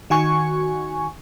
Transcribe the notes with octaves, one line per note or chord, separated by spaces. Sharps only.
D#3 F#4 G#5 C#6